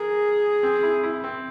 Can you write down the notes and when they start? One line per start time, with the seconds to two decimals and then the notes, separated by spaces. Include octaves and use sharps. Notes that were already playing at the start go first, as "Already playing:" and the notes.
Already playing: G#4 A#4
0.63 C4
0.83 E4
1.03 E4
1.24 C4